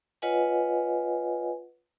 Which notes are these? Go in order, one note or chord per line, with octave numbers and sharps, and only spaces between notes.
F4 B4 C#5 D#5 F#5 G#5